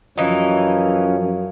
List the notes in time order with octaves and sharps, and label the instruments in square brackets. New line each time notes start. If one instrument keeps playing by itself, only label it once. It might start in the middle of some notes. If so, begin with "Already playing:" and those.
[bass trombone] F#2 [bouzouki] E3 D#4 [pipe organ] F3 C#4 [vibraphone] F5